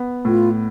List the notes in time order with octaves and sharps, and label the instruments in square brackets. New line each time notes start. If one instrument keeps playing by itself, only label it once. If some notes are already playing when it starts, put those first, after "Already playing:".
Already playing: [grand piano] B3
[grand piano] A2 [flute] F4